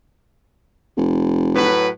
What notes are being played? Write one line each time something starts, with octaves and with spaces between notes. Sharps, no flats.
F1
A2 F#3 B4